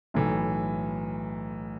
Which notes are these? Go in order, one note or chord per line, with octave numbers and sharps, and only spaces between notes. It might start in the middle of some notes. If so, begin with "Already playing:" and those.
B1 A2 E3 A3